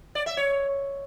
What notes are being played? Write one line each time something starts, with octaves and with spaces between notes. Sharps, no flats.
D5
E5
C#5